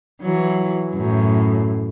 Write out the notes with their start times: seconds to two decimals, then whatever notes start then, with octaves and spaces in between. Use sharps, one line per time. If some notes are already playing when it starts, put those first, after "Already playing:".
0.21 E3 F#3
0.94 F#2 A2